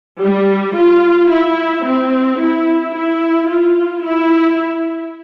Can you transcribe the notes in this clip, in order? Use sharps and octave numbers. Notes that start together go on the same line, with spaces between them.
G3
F4
E4
C4
E4
E4
F4
E4